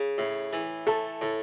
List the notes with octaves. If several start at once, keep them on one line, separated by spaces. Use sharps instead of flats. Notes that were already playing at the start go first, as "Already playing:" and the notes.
Already playing: C#3
A2
E3
A3 A4
A2